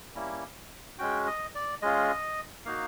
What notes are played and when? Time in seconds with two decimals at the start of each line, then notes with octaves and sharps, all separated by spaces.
0.14 G3 A#3 C#4 E4
0.99 G#3 C#4 F#4 G5
1.27 D#5
1.55 D5
1.82 G#3 C#4 F4 D#5
2.65 A#3 D#4 F#4 F5